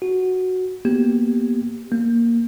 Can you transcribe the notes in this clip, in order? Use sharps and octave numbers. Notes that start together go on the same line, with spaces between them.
F#4
A#3 B3 G4
A#3